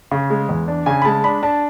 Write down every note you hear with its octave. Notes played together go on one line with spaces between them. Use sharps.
C#3
G#3
E2
D4
C#3 G#5
B5
G#3 A5
D4 B5
D4 A5